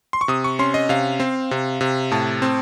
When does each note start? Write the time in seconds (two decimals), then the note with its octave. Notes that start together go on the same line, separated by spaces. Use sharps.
0.13 C6
0.21 C#6
0.28 C3 D#6
0.44 C#6
0.59 C#4 C6
0.74 D#5
0.89 C3 F5
1.20 C4
1.51 C3
1.81 C3
2.11 A2 A5
2.42 C4